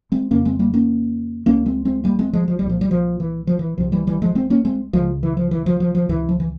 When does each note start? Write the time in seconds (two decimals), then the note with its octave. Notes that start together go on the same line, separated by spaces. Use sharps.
0.12 G#3 C4
0.31 F2 C#3 A#3 C#4
0.45 G#3 C4
0.59 G3 A#3
0.74 A#3 C#4
1.46 C#2 C3 A#3 C#4
1.66 G#3 C4
1.85 G#3 C4
2.04 G3 A#3
2.19 G#3 C4
2.33 F3 G#3
2.48 F3
2.59 C2 G3
2.67 A#2 F3
2.81 G3
2.91 F3
3.20 E3
3.47 F3
3.59 E3
3.78 C2 C3 F3
3.92 E3 G3
4.07 E3 G3
4.22 F3 G#3
4.35 G#3 C4
4.50 A#3 C#4
4.65 G#3 C4
4.93 C#2 C#3 F3 G#3
5.23 E3
5.37 F3
5.51 E3
5.66 F3
5.80 F3
5.95 F3
6.09 C#2 C3 E3
6.29 F3
6.40 E3